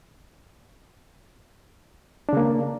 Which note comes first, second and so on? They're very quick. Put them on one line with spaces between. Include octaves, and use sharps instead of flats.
D4 C#3 A#3